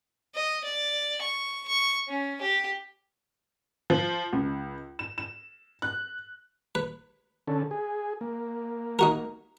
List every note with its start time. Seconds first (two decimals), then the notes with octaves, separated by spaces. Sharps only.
0.34 D#5
0.64 D5
1.22 C#6
1.68 C#6
2.08 C#4
2.41 G4
3.90 F3
4.33 C#2
4.99 E7
5.18 E7
5.82 F#6
6.75 B4
7.47 D3 C#4 A4
7.71 G#4
8.21 A#3
8.99 D#4 F#4 A#4